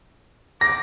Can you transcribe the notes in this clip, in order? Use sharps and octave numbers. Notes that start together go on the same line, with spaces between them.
D6 A#6